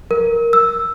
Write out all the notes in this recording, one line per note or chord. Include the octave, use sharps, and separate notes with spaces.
A#4
E6